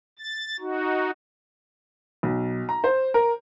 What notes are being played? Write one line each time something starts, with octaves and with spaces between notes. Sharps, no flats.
A6
D#4 F#4
B1
A#5
C5
A#4